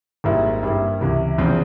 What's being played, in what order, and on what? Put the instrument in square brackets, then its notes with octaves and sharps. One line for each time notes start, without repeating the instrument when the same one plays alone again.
[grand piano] G#1 G#2 G3 A#3 E4
G2 G3 A#3 E4
C#2 C3 E3
E2 C#3 F3 C4